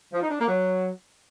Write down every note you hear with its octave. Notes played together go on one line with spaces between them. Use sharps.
F3
D#4
D4
A#3
F#3